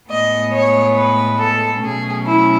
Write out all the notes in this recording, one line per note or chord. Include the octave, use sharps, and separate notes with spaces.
A2 G#3 B3 D#5
C#5
B4
A4
B2 F#3 A3 C#4 G#4
E4